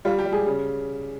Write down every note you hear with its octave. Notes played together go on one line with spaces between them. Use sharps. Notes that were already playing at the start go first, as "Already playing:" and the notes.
G3 F4
G4
G3
G#4
C#3